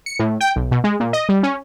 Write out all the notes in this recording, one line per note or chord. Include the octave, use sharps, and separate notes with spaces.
C#7
A2
G5
B1
B2
G#3
A#2
D#5
G3
C#4